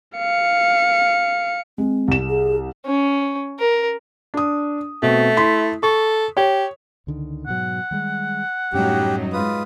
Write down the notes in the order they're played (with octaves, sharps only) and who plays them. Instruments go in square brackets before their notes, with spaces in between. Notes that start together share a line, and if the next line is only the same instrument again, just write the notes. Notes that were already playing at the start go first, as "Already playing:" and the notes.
[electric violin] F5 C#7
[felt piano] G#3 [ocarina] C4
[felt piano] C2 E7
[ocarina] G#4
[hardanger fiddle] C#4
A#4
[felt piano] D4 D#6
[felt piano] B2 C4 [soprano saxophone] A3
[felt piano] E4 C6 B6
[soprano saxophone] A4 [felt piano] C#6
[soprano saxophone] G4 [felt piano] C#5
[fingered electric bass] C#2 D3 D#3
[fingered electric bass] G#2 B2 F#3 [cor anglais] F#5
[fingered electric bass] D#3 G3 G#3
[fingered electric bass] F#2 G3 C#4 [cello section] A2 F#3 D#4 [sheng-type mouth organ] G4
[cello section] G#2 [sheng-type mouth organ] F4 B4 D#6